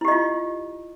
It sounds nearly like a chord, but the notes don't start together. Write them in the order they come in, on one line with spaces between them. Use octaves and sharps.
E4 G4 D#5 F4